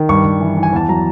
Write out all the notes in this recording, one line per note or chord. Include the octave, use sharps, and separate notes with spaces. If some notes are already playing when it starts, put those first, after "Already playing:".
Already playing: D#3
G2 C#6
G2
E3
E3
G#5
E2 A5
F#3 A#5